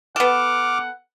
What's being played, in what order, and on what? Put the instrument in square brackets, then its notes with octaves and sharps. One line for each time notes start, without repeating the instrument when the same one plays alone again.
[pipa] B3 A4 [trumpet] F#5 [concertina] D6 F6